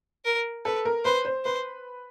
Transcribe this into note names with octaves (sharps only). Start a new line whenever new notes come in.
A#4
A4 B4
A#4
B4 C5
C5
B4 C5